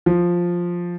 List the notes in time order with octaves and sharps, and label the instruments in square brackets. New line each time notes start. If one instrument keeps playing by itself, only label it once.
[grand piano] F3